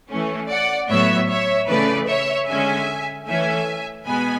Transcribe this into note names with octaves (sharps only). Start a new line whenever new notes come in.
E3 A3 C#4
D5 F#5
A2 F#3 B3 C#5 E5
C#5 E5
C#3 E3 A3 B4 D5
C#5 E5
D3 G#3 C#4 E5 G#5
E3 A3 C#4 E5 G#5
B2 G#3 B3 G#5 B5